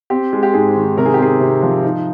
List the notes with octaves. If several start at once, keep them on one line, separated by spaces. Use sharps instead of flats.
C4 G4
G#3
G4
G#2 G#4
D#3
C3 A#4
G#4
G4
C4 G#4
C3
F3
D#4